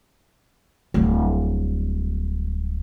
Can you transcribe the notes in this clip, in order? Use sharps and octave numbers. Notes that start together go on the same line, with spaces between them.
D1 G3